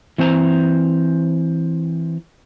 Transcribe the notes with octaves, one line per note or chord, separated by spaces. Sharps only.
E3 C4 C5 A5 A#5